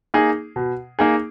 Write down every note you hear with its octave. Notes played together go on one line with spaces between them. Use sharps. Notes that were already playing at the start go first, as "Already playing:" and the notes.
A#3 D#4 G#4
B2
A#3 D#4 G#4